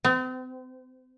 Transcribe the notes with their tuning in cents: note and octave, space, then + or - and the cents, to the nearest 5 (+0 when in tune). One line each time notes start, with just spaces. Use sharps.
C4 -40